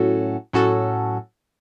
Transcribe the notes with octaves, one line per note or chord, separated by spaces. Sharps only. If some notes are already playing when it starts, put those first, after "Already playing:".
Already playing: A2 F#3 C#4 F#4 A4
A2 F#3 C#4 F#4 A4